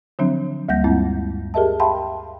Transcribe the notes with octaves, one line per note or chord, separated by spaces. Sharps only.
D3 F3 F#3 C4 D4
D2 G3 A#3 F#5 G6 A#6
G2 G#3 C4 E4
G4 G#4 A#4 D#5 E5 A5
E5 F5 G5 A5 B5 C6